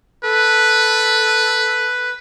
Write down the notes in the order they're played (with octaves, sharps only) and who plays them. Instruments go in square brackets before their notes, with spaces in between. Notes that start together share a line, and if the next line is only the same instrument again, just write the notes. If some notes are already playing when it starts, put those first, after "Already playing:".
[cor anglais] A4 [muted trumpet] B4